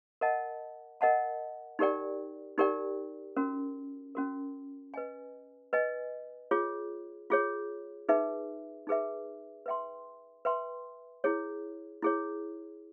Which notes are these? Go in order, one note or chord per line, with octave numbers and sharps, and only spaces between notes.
A#4 D#5 F#5 A5
A#4 D#5 F#5 A5
D#4 G4 A#4 D5 G5
D#4 G4 A#4 D5 G5
C#4 F#4 A#4
C#4 F#4 A#4
B4 D#5 G#5
B4 D#5 G#5
F4 G#4 C#5
F4 G#4 C#5
D#4 G#4 B4 E5
D#4 G#4 B4 E5
B4 E5 G5 C6
B4 E5 G5 C6
E4 G#4 C#5
E4 G#4 C#5